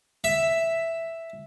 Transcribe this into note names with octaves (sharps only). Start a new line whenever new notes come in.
E5